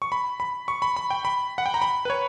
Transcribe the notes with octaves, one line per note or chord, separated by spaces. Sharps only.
C#6
B5
B5
C#6
B5
B5
G5
B5
F#5
G5
A#5
B5
B4
C#5